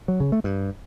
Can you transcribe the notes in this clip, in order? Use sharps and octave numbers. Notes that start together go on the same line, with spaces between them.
F#3
C#3
A3
G2